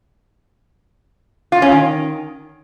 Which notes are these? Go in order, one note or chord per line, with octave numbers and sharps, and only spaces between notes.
F4
C#4
D#3